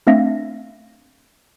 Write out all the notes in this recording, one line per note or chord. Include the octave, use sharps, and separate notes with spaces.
A3 C4 D4 E5 F5 A#6